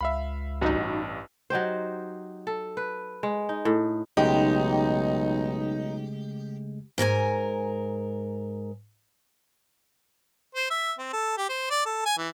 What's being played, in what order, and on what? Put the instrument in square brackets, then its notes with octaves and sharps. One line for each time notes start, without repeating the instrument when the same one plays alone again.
[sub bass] C#2 [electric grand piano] E5 F5 B5
[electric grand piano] A1 G2 [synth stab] D#4 F#4
[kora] F#3 D#4 G4 C5
A4
B4
G#3
D#4
A2
[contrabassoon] B1 [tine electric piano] C#3 G#3 A3 [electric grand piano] D#4 [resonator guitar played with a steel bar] G4
[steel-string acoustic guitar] G#2 A#4 C5 G#5
[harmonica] C5
E5
C4
A4
G4
C5
D5
A4
G#5
E3